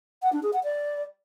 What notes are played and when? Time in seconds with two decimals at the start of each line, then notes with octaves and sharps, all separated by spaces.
0.22 F#5
0.33 D4
0.43 G#4
0.53 F#5
0.63 D5